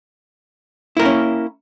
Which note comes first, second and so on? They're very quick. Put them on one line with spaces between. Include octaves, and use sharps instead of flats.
E4 A#4 A#3 C#4